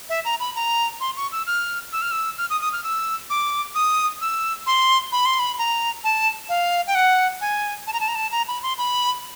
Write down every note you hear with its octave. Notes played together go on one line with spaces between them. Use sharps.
E5
A#5
B5
A#5
C6
C#6
E6
F6
E6
F6
E6
F6
D#6
D#6
F6
E6
D6
D#6
E6
C6
B5
C6
B5
A#5
A5
F5
G5
F#5
G#5
A5
A#5
A5
A#5
A5
A#5
B5
C6
B5